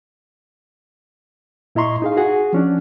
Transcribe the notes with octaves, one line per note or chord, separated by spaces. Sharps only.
A#2 E4 D#5 A#5 C6 C#6
D#4 G#4 F5
F#4 G#4 F#5
F3 C#4 D4